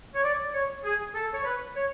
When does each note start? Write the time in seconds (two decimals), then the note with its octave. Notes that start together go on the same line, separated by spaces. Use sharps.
0.15 C#5
0.24 D5
0.54 C#5
0.84 G#4
1.15 A4
1.33 C#5
1.45 B4
1.75 C#5